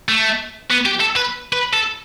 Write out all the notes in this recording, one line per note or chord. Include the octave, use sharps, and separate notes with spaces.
A3
B3
G4
A4
B4
B4
A4